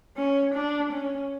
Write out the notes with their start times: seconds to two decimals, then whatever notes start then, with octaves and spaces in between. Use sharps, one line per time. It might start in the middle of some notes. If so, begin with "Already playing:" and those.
0.16 C#4
0.54 D4
0.92 C#4